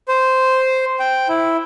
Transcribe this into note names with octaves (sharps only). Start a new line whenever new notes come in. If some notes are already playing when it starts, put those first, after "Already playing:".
C5
G5
E4